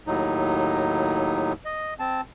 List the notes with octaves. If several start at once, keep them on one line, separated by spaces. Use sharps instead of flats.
D#2 A2 F#3 D#4
D#5
C4 A5